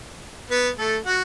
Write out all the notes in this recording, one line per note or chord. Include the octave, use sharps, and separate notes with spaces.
B3 B4
A3 A4
F#4 F#5